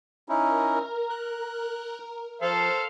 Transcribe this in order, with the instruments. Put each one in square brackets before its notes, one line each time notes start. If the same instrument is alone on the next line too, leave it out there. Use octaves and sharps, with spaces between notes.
[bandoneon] C#4 D#4 E4 [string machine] A#4
[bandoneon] F#6
[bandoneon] F3 [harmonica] A4 C5 F5 [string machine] F6